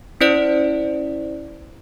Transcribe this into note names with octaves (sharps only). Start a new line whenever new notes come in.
C#4 E4 C5 D5 D7